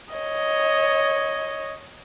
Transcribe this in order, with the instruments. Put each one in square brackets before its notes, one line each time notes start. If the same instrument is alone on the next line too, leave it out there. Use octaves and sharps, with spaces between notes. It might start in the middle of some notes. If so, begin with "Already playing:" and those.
[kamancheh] C#5 D#5